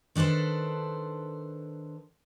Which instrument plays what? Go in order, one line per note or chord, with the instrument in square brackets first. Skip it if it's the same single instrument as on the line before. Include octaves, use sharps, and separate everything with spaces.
[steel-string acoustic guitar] D#3 D4 A4 B4 C5